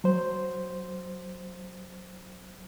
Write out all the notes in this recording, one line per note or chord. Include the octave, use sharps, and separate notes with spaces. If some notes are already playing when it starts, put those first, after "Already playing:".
F#3 C5